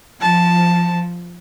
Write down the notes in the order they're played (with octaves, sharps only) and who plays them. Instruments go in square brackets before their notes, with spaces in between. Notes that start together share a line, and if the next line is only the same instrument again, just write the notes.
[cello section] F3 [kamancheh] A5